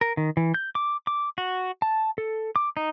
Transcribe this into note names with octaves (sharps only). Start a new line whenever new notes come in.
A#4
D#3
E3
G6
D6
D6
F#4
A5
A4
D6
D#4